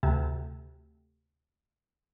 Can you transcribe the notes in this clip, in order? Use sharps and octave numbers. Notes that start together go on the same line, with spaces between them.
D2 C3